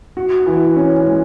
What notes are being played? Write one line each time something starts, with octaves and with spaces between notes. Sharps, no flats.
F#4
E3
C#4
G#3